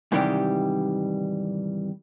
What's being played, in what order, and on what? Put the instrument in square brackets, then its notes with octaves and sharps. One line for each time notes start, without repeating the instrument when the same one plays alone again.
[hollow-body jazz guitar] G#2 C3 D#3 E3 G3 G4